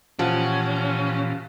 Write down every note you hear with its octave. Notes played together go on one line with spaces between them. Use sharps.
A#2 E3 F3 C#4 G4 F#5